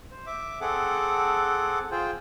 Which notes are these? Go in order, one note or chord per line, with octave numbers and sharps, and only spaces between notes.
C5
E5 D6
C4 G#4 A4 F#5 D6
F4 G#4 C5 G5